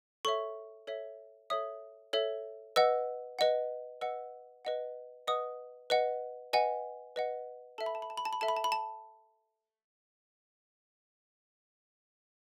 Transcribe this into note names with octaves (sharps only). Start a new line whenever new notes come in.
A4 C#5 E5 C#6
A4 C#5 E5
A4 C#5 E5 D#6
A4 C#5 E5
B4 D#5 F#5 E6
B4 D#5 F#5
B4 D#5 F#5 E6
B4 D#5 F#5
B4 D#5 F#5 D#6
B4 D#5 F#5
B4 D#5 F#5 G#5
B4 D#5 F#5
A4 E5 A5
B5
A5
B5
A5
B5
A5
B5
A4 E5 A5
B5
A5
B5
A5